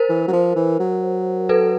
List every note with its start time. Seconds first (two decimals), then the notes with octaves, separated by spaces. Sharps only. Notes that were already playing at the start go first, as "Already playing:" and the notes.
Already playing: A#4 C5
0.09 E3
0.28 F#3
0.33 F3
0.56 E3
0.80 F#3
1.49 A4 B4